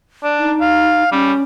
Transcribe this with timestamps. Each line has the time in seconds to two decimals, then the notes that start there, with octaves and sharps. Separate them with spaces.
0.23 D4
0.39 D#4
0.61 F5
1.12 G3 C#4